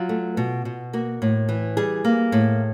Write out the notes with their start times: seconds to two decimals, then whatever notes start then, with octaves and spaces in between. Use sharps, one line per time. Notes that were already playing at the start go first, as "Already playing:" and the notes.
Already playing: F#3 F4
0.09 A3
0.37 B2
0.65 B2
0.93 A#3 F#4
1.22 A2
1.49 E3
1.77 G3 G#4
2.05 A#3
2.32 A2